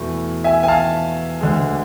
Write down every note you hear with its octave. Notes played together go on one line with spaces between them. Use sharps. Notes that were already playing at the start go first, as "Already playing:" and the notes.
Already playing: E2 B2 A3 E4
E5 G#5
G#5
F5 A5
D2 D3 G#3